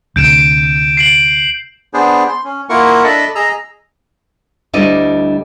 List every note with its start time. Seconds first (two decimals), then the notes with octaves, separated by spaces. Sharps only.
0.16 D2 C3 G6 D7 E7
0.97 C7 D7 F#7
1.94 B3 D4 G#4 C5
2.29 C6
2.44 C#4
2.69 A#3 E4 F4 A#4 F#5 C#6
3.04 D4 A4 D#5 E5 A5 B5
3.35 G#4 D#5 A#5 E6
4.73 D2 G3 D4 E4 D#5